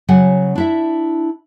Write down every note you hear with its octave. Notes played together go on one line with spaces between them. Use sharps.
C#3 F#3 F#5 G#5
D4 E4 E5